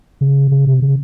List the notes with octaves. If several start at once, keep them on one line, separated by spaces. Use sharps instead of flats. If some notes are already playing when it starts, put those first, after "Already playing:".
C#3
C#3
C3
C#3